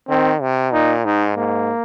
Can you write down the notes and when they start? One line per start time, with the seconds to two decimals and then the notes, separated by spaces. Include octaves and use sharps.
0.09 D#3 C4
0.41 C3
0.73 A#2 D#4
1.05 G#2 D#4
1.37 G#2 A#3